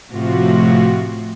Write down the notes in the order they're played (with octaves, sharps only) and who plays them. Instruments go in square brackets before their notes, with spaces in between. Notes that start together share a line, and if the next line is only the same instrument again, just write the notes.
[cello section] A2 C3 F3 A3 F4 F#4